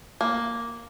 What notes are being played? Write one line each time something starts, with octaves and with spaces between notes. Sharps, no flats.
A#3